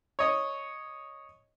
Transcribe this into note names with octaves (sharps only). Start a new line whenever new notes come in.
C#5 D#5